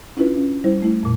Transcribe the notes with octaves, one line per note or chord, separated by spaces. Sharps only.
C#4 D4 E4 F4 B4
C#4
G3 E4 C5
A3 E4
F2 A#2